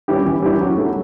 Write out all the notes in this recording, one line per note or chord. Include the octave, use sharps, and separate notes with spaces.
G3 C#4 E4 G4
E3
G3 C#4 E4 G4
F#3
A3 E4